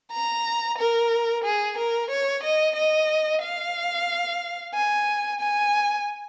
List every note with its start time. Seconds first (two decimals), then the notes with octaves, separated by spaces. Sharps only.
0.12 A#5
0.78 A#4
1.44 G#4
1.78 A#4
2.11 C#5
2.43 D#5
2.76 D#5
3.42 F5
4.74 G#5
5.40 G#5